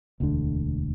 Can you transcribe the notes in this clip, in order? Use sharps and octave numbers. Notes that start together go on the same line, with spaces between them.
E1 D2 D3